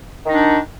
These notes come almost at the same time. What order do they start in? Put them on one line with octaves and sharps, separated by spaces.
D#3 D#4 D4